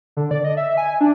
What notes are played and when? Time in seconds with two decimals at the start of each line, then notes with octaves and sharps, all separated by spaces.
0.17 D3
0.31 D5
0.44 D#5
0.57 E5
0.77 G#5
1.01 D4